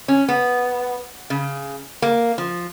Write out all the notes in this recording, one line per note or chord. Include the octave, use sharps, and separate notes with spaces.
C#4
B3
C#3
A#3
F3